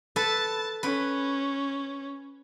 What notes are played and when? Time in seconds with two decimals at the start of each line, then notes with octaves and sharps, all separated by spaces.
0.16 A4 B4 A5
0.83 C#4 B4